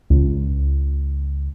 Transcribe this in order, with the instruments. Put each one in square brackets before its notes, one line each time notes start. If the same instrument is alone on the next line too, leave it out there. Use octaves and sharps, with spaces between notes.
[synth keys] C#2